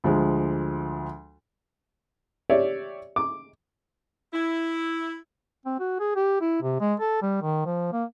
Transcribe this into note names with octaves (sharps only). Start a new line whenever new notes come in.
D2 F3 G#3
G4 C#5 D5 E5
D6
E4
C4
F#4
G#4
G4
E4
C3
G#3
A4
G3
D#3
F3
A#3